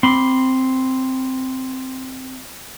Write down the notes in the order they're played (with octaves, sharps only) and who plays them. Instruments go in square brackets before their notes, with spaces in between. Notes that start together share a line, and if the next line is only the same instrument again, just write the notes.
[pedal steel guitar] C4 B5 D6 [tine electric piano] C6